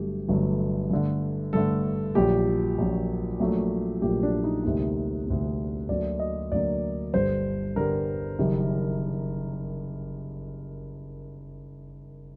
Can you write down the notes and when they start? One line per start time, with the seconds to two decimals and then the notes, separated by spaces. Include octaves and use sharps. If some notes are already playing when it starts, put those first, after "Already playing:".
Already playing: G1 G2 F#3 A3 G4
0.29 G1 G2 F#3 A3
0.91 G2 D3 A3
1.53 G2 D3 A3 A4
2.15 A#1 A#2 F#3 G4
2.78 A#1 A#2 F#3
3.40 A#1 A#2 F#3 A3
4.02 A#1 A#2 F#3 A3 G4
4.23 D4
4.44 D#4
4.64 D2 C3 G3 A#3 D#4
5.27 D2 C3 G3 A#3
5.89 D2 D3 F#3 A#3 D5
6.20 D#5
6.52 D2 D3 F#3 A#3 D5
7.14 G1 G2 D3 G3 C5
7.76 G1 G2 D3 G3 A#4
8.38 F#1 F#2 D#3 G3